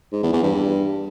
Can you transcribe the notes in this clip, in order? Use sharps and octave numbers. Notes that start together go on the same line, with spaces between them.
G#2
E2
E2
G2